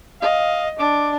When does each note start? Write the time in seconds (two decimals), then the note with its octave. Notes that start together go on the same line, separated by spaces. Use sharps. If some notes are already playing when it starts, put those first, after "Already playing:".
0.22 D#5 F5
0.79 D4 D6